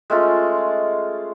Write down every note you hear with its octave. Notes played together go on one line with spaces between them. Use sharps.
G#3 A3 C#4 F4